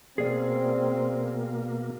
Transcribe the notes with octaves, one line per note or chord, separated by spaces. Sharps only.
B2 A#3 C4 G#4 D5